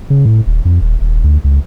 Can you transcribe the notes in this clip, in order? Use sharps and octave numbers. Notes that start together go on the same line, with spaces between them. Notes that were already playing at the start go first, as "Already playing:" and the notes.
C#3
A2
D#1
F2
D#1
D#1
D2
C#2